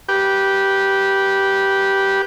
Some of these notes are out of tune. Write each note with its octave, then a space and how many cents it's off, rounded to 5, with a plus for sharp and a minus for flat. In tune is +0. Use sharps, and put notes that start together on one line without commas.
G4 -10 B4 -20